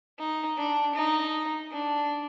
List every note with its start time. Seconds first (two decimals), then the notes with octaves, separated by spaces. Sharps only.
0.19 D#4
0.57 D4
0.95 D#4
1.71 D4